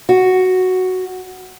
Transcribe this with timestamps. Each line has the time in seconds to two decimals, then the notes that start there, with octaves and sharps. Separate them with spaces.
0.09 F#4